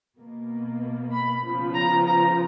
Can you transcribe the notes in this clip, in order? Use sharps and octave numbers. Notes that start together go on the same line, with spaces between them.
B2 A#3
B5
C#3 F3 B3
A#5
A#5